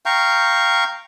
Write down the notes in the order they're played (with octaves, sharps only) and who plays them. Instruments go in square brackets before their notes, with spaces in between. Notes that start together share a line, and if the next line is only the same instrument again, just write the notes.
[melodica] F5 G5 A#5 C#6